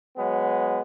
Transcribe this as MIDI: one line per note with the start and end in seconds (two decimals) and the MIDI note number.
0.17 0.80 54
0.17 0.80 56
0.17 0.80 59